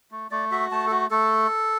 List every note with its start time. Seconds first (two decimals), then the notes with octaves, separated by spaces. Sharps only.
0.11 A3
0.31 A3 D5
0.51 F#4 E5
0.71 A3 A5
0.87 A4
0.91 F#4
1.11 A3 A4